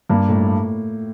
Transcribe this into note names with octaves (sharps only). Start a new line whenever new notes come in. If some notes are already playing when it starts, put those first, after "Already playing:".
G2 A#3
A2